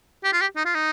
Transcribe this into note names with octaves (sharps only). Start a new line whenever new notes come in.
G4
F4
G4
D#4
F4
D#4